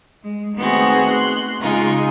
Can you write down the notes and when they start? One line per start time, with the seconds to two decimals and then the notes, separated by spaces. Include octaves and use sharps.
0.24 G#3
0.57 D#3 A3 B3 C4 F#4 G#4
1.08 C6 F#6
1.60 C#3 G#3 D#4 F4